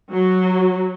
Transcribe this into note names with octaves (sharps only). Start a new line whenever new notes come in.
F#3